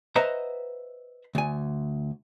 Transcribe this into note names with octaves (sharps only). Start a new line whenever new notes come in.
B4 C5 D#5 E5 F#5 A#5
D2 G#5